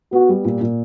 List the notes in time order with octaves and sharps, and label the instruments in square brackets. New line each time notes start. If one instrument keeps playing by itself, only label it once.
[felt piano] B3 [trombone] F#4
[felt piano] G3
A#2
A#2